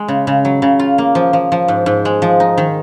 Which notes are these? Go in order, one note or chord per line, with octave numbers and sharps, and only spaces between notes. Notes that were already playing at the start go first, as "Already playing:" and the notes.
Already playing: G#3
C#3
C#3
F#3
C#3
F4
A#3
F3
F3
F3
G#2
G#2
G#3
F3
D#4
D#3